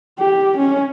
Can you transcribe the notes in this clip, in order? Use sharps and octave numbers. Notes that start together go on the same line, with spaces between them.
G4
C#4